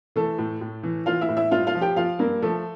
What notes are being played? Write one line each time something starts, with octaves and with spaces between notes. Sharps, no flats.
E3 A3 A4
A2
A2
E3
E3 F4 F5
E4 E5
A2
E4 E5
G2 F4 F5
F4 F5
F3
G4 G5
F3 F4 F5
G2 A#3 A#4
F3 A3 A4